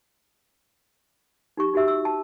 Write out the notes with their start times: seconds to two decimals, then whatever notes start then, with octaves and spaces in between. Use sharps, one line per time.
1.57 D#4 G4 C#6
1.74 D#4 F#4 G4 E5 E6
1.88 E6
2.05 A5